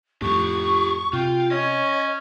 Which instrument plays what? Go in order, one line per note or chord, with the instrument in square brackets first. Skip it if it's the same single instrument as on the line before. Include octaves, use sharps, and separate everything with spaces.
[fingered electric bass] F2 A2 [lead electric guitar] G4 A4 [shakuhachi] C#6
[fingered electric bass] C3 [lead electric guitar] F4 [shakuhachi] G5
[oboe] C#4 [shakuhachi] C#5 [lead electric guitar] D#5